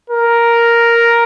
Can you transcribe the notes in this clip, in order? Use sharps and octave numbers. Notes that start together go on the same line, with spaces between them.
A#4